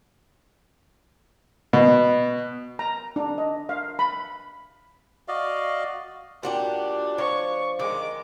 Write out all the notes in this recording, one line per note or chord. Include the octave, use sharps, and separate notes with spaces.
B2
A#5
D4
D#5
F5
B5
F#4 D5 D#5 F5
A#2 D4 F#4 G4
F3 C#5 C#6
D#3 G#3 D6